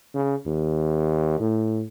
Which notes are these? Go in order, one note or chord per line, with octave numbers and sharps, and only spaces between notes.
C#3
D#2
A2